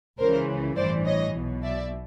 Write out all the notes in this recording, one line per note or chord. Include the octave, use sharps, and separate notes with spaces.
C#2 C#3 E3 A#4 C5
A1 G2 E3 C5 D5
C#5 D#5
B1 B2
D5 E5